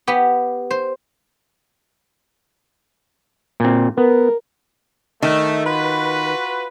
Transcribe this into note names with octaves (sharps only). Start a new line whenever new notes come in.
B3 G4
C5
A#2 C4
B3 A#4
D#3 A3
F4 F#4 B4